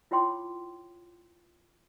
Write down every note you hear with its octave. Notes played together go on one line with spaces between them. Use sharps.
E4 F4 C#5 G5 C6 D6